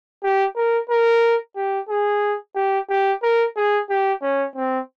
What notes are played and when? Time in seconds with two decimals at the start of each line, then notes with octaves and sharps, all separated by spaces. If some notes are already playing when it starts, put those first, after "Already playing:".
0.23 G4
0.56 A#4
0.89 A#4
1.56 G4
1.89 G#4
2.56 G4
2.89 G4
3.23 A#4
3.57 G#4
3.90 G4
4.22 C#4
4.56 C4